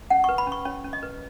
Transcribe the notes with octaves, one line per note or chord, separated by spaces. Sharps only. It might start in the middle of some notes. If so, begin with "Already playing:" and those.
C#4 F#5
C#6
B4
B5
C#4 C#6
C#4 C#5
C#4
D#5
B4